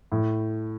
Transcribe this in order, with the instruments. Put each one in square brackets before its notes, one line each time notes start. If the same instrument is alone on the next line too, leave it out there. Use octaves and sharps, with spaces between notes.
[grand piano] A2